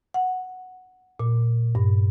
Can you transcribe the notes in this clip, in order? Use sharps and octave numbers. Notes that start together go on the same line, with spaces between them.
F#5
A#2
G2